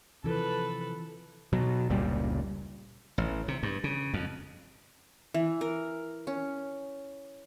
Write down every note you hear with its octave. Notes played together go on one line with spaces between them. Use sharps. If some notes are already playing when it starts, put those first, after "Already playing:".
C3 E3 F3 A4 B4
B2 F#3
F1 C#2 A#2 G3
A1
C3
G2
C#3
F2
E3
A#4
C#4